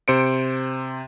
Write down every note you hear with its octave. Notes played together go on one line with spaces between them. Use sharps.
C3 C5 C#7 D7